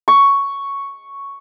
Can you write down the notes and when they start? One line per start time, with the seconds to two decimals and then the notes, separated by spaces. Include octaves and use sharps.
0.08 C#6